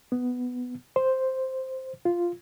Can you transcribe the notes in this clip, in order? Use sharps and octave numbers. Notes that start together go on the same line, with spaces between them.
B3
C5
F4